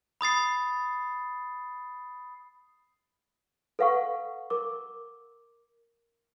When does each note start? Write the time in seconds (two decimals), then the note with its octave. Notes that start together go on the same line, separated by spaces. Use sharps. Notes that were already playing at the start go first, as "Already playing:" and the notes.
0.21 B5 D#6 A6 C7
3.79 A4 B4 F5 F#5 C#6
4.50 A#4 D6